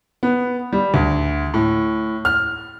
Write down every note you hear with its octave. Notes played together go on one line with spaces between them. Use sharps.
B3
G3
D2
A2
F6